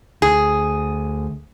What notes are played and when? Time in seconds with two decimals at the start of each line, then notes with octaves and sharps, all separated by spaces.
0.22 D2 G#4